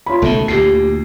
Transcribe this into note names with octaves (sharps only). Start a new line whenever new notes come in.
F4 C#5 B5
C#2 B2 D#3 A3
D2 A#2 G4 C7